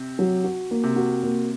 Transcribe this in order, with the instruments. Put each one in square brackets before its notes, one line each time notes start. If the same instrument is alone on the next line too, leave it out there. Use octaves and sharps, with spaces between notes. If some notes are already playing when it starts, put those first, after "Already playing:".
Already playing: [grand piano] C3
[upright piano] F#3
F#4
A#3
[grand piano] C3
[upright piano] F#4
A#3